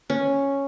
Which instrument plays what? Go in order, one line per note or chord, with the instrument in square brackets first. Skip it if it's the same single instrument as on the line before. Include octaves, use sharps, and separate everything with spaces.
[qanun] C#4